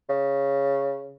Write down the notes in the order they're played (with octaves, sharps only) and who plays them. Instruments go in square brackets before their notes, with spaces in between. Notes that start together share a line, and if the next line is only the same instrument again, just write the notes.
[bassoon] C#3